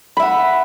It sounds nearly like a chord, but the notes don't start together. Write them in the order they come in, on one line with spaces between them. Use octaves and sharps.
B5 E5 F#5